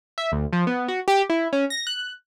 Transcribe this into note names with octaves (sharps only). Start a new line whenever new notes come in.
E5
D2
F3
B3
F#4
G4
E4
C#4
A#6
F#6